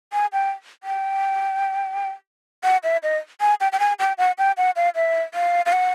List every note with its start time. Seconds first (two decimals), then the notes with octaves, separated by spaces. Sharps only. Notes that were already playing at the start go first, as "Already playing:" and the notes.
0.13 G#5
0.33 G5
0.84 G5
2.64 F#5
2.84 E5
3.03 D#5
3.41 G#5
3.61 G5
3.72 G5
3.80 G#5
3.99 G5
4.18 F#5
4.38 G5
4.57 F#5
4.76 F5
4.95 E5
5.34 F5
5.66 F5
5.73 F#5